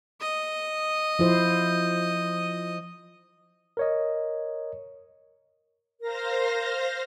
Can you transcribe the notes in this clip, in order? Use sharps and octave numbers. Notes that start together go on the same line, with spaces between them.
D#5
F3 E4 C5
A#4 C#5 D#5
A#4 C5 F5 A#6